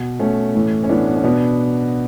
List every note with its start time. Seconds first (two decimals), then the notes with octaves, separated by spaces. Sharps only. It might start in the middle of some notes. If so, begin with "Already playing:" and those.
Already playing: B2
0.19 B2 A3 C#4
0.55 A2 E3
0.84 C#4
0.89 A2 E3 B3 D4
1.07 B3
1.16 C#4
1.24 B2 B3 D4